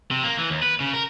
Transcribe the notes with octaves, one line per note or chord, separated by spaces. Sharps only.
C3
A#3
E3
D#2
B4
C#3
A#4